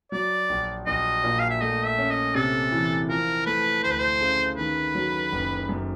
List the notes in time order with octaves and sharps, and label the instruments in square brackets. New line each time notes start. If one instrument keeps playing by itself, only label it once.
[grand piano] F#3 [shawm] D5
[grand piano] A#1
[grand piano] A#1 [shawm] D#5
[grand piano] A#2
[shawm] F5
E5
[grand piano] A3 [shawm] D#5
[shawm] E5
[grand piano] C#4
[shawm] D#5
[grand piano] C3 [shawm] A4
[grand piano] E3
[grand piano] F3 [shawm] A#4
[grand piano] A3 [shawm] B4
[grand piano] D2 [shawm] C5
[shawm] B4
C5
[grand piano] C#3
[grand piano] D#3 [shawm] B4
[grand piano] F#3
F#1
F#2